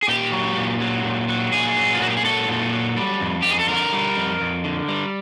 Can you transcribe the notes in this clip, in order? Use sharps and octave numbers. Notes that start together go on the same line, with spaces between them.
G#4
A#2 G4
F#3
A#2
F#3
A#2
F#3
A#2 G#4
F#3
F4
A#2 F#4
G4
G#4
F#3 A4
A#2
F#3
G3
F2
F2 G4
G#4
A4
D3 A#4
G3
F2
F2
D3
G3